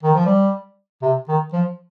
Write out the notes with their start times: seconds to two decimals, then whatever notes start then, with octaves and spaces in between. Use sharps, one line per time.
0.03 D#3
0.15 F3
0.26 G3
1.02 C3
1.28 D#3
1.53 F3